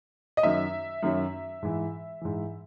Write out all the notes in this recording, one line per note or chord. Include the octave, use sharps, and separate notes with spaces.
D#5
F#2 D#3 F#3 E5
F#2 D#3 F#3
G#2 E3
G#2 E3